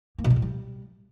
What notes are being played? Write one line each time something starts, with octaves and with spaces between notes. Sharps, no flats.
A#3
B2
G3
A2
G3